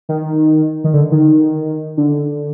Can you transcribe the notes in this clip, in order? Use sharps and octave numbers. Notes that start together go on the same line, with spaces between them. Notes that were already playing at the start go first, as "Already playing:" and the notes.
D#3
D#3
D3
D#3
D3